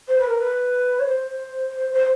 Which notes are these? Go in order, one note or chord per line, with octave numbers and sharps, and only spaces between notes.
C5
B4
A#4
B4
C#5
C5
C5